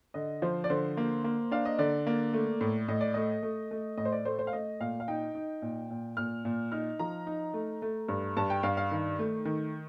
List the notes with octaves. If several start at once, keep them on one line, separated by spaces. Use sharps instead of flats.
D3 D#5
F3 C5
D5
D3 C5
A#3
A#3
D4 F5
D#5
D3 D5
A#3
A3
A2
A2 D#5
D5
A3 D#5
A3
A3
A2 D#5
C5
D5
A3 C5
C5
F5
A3 D#5
A#2 F5
F5
D#4 G5
D#4
A#2
A#2
A#2 F6
A#2
D#4 F6
F3 A#5
D#4
A3
A3
G2
G2 A5
G5
G2 F5
F5
D#3
A3
D#3